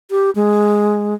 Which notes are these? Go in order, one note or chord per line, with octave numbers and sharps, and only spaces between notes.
G4
G#3